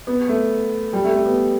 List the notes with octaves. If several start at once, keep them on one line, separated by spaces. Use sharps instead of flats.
B3
A3
G3
A3
A3
B3